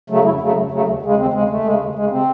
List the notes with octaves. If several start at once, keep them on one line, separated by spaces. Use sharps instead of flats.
C#3 F#3 A3
F#2 E4
C#3 F#3 A3
F#2
C#3 F#3 A3
D#2
C#3 G#3
D#2 C4
C#3 G#3
D#2 A3
C#3 G#3
D#2
C#3 G#3
C3 C4